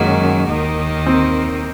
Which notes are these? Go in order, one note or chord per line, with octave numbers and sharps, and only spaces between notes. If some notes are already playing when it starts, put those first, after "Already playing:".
Already playing: F#2 D#3 F#3 G#3 A#3 C#4 F#4
D#2 D#3 A#3 D#4
C4